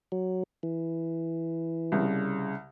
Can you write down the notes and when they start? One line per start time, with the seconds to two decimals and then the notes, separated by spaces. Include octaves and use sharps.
0.12 F#3
0.63 E3
1.92 C2 C#3